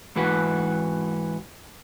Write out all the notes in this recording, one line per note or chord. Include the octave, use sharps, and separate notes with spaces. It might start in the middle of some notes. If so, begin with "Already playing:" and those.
G#2 E3 F#4 B4